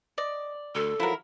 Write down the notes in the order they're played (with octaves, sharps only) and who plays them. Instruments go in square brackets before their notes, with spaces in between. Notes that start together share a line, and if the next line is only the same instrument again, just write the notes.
[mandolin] D5 [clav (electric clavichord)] D#5
[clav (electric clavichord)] D2 [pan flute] A4
[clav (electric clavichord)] F3 F#3 [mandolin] E4 A#4